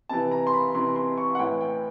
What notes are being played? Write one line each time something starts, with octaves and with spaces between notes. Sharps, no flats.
C3 E3 A5
A#5
C6
B5
C3 E3 C6
C6
C#6
F#5
A2 E3 G5
G5